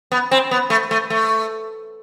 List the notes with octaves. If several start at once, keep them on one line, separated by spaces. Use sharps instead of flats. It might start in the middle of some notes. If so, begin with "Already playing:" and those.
B3
C4
B3
A3
A3
A3